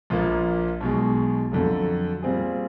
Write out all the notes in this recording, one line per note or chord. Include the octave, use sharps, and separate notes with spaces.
A#1 A#2 F3 A#3
B1 B2 G#3
F2 D3 F#3
A#2 G3 C4 F4 G#4